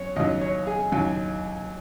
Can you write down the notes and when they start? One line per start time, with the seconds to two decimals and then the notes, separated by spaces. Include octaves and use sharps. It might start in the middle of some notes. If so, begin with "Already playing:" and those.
Already playing: F#3 C#5
0.16 D#2 C#3 F#3 D#5
0.41 C#5
0.67 G#4
0.92 D#2 C#3 F#3